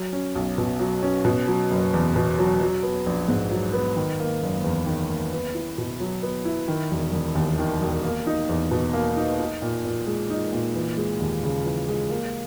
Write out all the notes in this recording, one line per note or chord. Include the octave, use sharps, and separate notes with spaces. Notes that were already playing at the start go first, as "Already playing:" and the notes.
Already playing: F#3
C#4
B1
B2
F#3
C#4
B2
F#3
F#1
E2
B2
F#3
F#3
B3
A#1
G#2
F#3
B3
D#3
A#3
F#1
E2
D#3
A#3
B3
E4
B2
F#3
B3
E4
D#3
E1
E1
D#2
D#3
E1
A#3
D#4
E2
B2
A#3
D#4
D#4
A#2
A#2
G#3
D#4
A#2
E3
G#3
D#2
C#3
E3
G#3
A#3